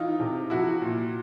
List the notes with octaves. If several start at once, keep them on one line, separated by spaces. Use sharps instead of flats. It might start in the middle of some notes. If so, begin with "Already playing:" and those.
Already playing: E3 D#4 F4
C3
F3 E4 F#4
A#2